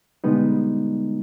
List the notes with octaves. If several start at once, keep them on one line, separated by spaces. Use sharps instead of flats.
B2 D3 G3 G#3 B3 D#4